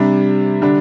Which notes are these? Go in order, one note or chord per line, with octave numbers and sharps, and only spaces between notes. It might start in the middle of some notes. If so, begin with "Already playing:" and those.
Already playing: C3 G3 D4
D3 G3 D4